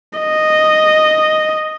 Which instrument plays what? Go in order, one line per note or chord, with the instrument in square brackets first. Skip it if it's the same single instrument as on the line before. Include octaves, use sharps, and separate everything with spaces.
[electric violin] D#5